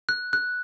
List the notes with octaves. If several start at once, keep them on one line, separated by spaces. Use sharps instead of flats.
F#6
F#6